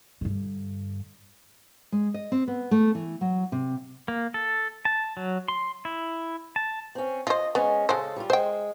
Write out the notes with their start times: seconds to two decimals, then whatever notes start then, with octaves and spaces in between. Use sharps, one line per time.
0.21 G2 D3
1.92 G#3
2.14 D#5
2.32 C4
2.48 B3
2.71 A3
2.95 E3
3.21 F#3
3.52 C3
4.08 A#3
4.34 A4
4.85 A5
5.17 F#3
5.48 C6
5.85 E4
6.56 A5
6.95 C4 C#4
7.27 F4 C5 D#5
7.55 G#3 B3 C#4
7.89 C#3 G#3 A4 C5
8.16 G3 F4
8.30 G#3 C5 G5